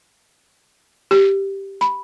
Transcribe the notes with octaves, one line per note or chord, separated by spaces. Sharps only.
G4
B5